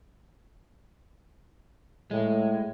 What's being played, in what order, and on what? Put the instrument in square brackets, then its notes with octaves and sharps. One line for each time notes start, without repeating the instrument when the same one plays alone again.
[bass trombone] A2 [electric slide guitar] G#3